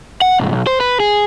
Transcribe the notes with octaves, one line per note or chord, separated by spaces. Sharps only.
F#5
C2 G#2
B1
C5
B4
G#4